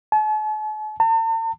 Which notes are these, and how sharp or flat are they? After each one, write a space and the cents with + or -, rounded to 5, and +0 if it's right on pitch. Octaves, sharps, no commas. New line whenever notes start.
A5 -45
A5 +45